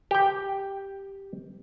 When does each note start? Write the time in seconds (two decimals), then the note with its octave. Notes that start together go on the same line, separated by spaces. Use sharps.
0.11 G4 G5